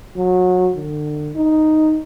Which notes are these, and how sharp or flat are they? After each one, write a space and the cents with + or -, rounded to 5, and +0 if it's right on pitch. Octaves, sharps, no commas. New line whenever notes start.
F#3 -25
D3 +35
D#4 +0